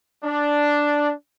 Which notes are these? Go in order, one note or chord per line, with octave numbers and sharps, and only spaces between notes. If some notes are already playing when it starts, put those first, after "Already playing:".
D4